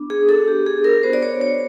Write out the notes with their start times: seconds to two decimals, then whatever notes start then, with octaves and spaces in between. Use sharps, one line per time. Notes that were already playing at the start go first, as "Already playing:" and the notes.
Already playing: B3 D4
0.10 G#4
0.28 B3 D4 F#4 A4
0.48 G4
0.67 G#4
0.84 A#4
1.03 B3 D4 F#4 C5
1.13 D5
1.23 C#5
1.41 C#5